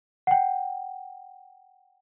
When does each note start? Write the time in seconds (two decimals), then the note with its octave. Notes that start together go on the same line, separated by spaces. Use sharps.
0.27 F#5 G5